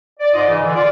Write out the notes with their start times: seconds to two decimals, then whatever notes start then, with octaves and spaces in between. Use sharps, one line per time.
0.20 D5
0.33 G#2 F4 D5 D#5
0.49 C#3 E3
0.62 D3 E3
0.75 F4 D5